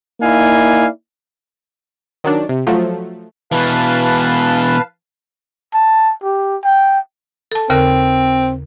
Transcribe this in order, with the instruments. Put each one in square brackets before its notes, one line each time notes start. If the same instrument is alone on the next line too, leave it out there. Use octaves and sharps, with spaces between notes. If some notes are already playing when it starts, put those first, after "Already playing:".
[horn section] A#3 D#4 E4 D5 F5 G#5
[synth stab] D#3 F#3 D4
C3
F3 F#3 A3
[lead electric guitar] B2 E3 [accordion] B4 F5 A5
[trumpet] A5
G4
G5
[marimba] A4 A5
[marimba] D#2 C#3 A#4 [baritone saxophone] C4